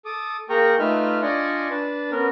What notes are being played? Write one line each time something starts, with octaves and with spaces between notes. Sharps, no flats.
A4 D6 D#6
A#3 G#4 A#4 G5 A#5 C#6
A3 D#4 F4 B4 E5 F6
D4 F4 D5 D#5 G#5 C#6
D4 B4 A5
B3 C#4 A#4